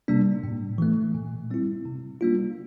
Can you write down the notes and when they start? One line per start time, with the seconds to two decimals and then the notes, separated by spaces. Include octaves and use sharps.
0.08 C3 G3 A#3 D4
0.44 A2
0.78 E3 A3
1.15 A#2
1.51 G3 C4 E4
1.86 C3
2.21 G3 A#3 D4 F4